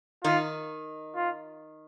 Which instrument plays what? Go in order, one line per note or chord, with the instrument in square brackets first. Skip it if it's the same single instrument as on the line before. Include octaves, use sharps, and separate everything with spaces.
[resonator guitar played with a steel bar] D#3 D#4 [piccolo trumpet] F4
[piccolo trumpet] F4